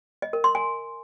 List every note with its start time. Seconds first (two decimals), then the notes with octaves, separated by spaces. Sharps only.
0.22 D#5
0.33 A#4
0.44 C6
0.55 G#5